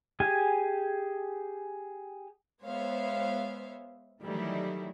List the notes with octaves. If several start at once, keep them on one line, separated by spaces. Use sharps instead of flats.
G4 G#4 G#5
G#3 B3 C5 C#5 E5 F5
D#3 E3 F#3 G3 A3 E4